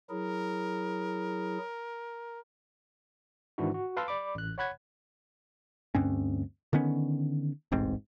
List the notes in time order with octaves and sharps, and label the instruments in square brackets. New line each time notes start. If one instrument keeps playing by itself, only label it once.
[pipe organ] F#3 E4 G#4 [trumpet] A#4
[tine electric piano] G#2 D#3 E3 D4 E4 F#4
F#4
B4 F5 A5 C6 E6
D5 B5 D6
A1 F#6
C#5 F#5 B5 F#6 G#6
[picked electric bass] D2 G2 C4 C#4
D3 D#3 B3 C#4
E1 A1 G#2 C4